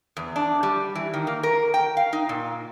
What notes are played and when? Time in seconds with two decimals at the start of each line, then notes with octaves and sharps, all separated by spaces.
0.17 E2
0.36 D4
0.63 G3
0.95 E3
1.14 D#3
1.27 A#3
1.43 A#4
1.74 G5
1.97 F5
2.13 D#4
2.29 A#2